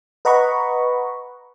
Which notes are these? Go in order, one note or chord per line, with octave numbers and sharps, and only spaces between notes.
B4 D#5 F#5 A#5 B5 C#6